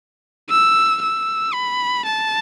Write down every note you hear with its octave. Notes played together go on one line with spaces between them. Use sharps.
E6
E6
B5
A5